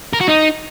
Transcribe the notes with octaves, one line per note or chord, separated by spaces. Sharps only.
A#4
F#4
D#4